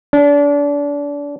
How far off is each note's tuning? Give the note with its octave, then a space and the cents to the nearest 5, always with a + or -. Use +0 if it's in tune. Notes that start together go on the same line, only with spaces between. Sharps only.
D4 -30